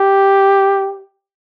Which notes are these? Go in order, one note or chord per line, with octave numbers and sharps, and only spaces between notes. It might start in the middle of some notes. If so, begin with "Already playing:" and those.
Already playing: G4